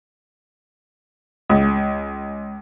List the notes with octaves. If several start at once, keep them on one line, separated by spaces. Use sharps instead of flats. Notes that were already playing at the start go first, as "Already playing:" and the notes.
C#2